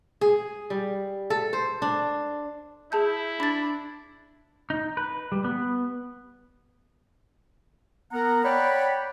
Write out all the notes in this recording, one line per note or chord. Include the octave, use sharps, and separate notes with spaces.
G#4
G3
A4
C5
D4
E4 G#4 A5 G6
D4 B5 A6
D#4
B4
G3
B3
B3 A#4 F#5 A#5
C#5 D5 F#5 G5 B5